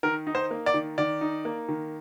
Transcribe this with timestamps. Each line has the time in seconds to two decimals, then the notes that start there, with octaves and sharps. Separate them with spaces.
0.03 D#3 A#4
0.27 D#4
0.35 C5
0.51 A#3
0.66 D5
0.74 D#3
0.98 D#3 D5
1.21 D#4
1.45 A#3
1.69 D#3